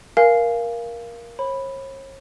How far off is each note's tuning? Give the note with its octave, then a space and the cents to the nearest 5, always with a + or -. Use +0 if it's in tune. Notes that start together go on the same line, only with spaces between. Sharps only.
A#4 +15 F5 -15 G#5 +0
C#5 -40 B5 +0